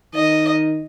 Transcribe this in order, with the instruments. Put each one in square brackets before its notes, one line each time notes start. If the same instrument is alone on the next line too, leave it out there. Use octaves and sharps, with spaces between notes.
[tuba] D#3 [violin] D#5